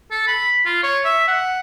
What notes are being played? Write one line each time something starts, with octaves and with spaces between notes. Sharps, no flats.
A4
B5
F4
C#5
E5
F#5